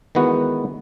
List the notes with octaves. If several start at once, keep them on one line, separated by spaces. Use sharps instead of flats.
D#3 E3 G#3 B3 F#4